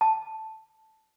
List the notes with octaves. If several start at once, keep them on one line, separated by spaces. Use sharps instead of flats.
A5